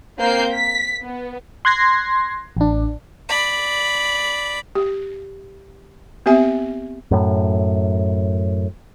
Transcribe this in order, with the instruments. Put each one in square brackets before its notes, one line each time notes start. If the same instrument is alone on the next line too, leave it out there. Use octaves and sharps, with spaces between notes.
[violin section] A#3 C4 G6 C7
B6
B3
[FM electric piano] C6 F#6 G#6 A#6 C7
A1 D4
[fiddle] D5 B5
[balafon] G4
B3 C4 G4 E5 G#5
[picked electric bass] F#2 A2